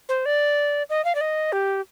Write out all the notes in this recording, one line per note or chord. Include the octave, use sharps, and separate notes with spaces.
C5
D5
D#5
F5
D5
D#5
G4